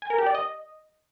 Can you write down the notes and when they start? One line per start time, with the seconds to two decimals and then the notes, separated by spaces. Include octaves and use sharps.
0.02 G#5
0.10 A#4
0.18 G4
0.26 D5
0.35 D#5